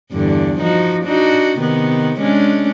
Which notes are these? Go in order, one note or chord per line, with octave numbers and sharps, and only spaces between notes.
E2 G2 D3
F3 D#4 F#4
D4 D#4 F#4
C3 D#3 B3
G#3 C#4 D4